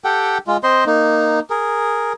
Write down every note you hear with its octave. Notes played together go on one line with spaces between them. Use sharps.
G4 A4 F#5 G5
G#3 F4
C4 C5 D#5 C6
A#3 D#4
G#4 A#4